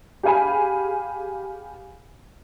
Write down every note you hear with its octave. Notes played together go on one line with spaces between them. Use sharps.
G4 G#4 F5 G#5 B5